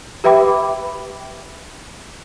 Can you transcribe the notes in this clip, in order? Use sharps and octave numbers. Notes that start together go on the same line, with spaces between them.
G4 B4 E5 G5 B5 D6